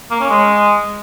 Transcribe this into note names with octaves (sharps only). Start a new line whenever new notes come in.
A#3
C#4
G#3